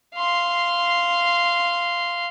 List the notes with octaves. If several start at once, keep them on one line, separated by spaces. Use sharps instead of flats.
F5 C6